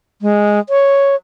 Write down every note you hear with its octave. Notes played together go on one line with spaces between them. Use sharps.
G#3
C#5